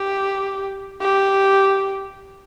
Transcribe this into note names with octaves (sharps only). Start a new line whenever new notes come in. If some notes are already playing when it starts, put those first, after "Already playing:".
Already playing: G4
G4